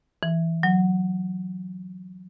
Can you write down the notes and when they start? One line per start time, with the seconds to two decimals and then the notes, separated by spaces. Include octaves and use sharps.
0.23 E3
0.63 F#3